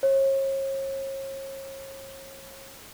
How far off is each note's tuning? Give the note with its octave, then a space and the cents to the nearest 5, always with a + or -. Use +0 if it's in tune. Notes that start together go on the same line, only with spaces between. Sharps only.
C#5 -40